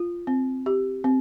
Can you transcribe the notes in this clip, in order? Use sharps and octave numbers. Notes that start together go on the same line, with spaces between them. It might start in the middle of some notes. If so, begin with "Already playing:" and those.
Already playing: F4
C4
G4
C4